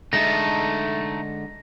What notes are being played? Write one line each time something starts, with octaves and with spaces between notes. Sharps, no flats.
D3 G#3 A3 D#4 A5 A#6